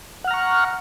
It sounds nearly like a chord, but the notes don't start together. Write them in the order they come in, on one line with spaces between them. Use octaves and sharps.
F#5 F6 A#5 C#6